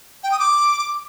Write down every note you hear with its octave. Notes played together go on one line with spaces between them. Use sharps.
G5
D#6
D6